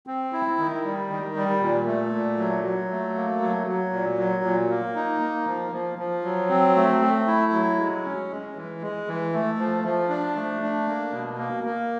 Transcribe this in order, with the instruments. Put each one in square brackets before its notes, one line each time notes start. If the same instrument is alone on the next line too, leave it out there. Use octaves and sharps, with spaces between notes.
[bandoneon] C4
E4
D#3
G3
D#3
G3
A#2
A3
A#2
F#3
F#3
A3
A#3
F#3
F#3
A#2
F#3
A#2
A#3
D#4
A#3
F3
F3
F3
F#3
C4
A3
A3
E4
F#3
G#3
C#4
G#3
E3
G#3
E3
A3
F3
F3
D4
A3
D4
A#3
B2
A#3
A#3